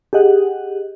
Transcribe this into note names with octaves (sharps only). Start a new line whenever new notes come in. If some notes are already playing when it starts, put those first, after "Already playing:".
G4 G#4 D#5 F#5